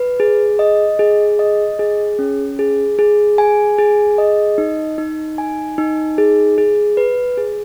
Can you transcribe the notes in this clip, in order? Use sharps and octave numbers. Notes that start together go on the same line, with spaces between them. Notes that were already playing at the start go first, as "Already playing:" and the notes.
Already playing: B4
G#4
D#5
G#4
D#5
G#4
C#4
G#4
G#4
G#5
G#4
D#5
D#4
D#4
G#5
D#4
G#4
G#4
B4
G#4